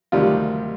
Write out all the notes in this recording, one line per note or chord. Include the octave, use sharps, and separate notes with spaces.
D2 C3 D#3 G3 F4